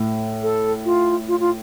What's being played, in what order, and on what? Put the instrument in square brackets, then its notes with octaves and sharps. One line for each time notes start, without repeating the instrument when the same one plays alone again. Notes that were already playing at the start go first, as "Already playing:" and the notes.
Already playing: [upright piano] A2
[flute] A4
F4
F4
F4